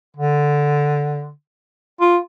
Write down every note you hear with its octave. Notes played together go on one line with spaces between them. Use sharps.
D3
F4